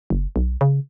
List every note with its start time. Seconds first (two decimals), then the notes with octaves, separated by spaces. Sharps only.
0.10 F#1
0.36 B1
0.61 C#3